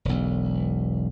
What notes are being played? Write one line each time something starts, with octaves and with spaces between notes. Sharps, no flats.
E1 B1